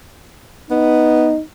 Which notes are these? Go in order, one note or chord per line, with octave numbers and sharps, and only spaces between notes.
B3 D#4